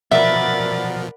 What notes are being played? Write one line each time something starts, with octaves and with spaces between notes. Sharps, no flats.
B2 F3 A#4 D5 E5 F#5 B5 A6